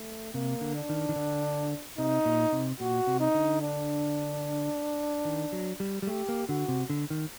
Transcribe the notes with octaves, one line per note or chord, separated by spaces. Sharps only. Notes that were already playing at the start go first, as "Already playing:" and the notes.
Already playing: A3
C3 A#3
D3
D4
D#3
D#3
D3
C3 D#4
A#2
C3
A#2 F#4
C3
D#4
D3
D4
D#3
F#3
G3
G3
A3 G4
A#3
D3 F#4
C3
D3
D#3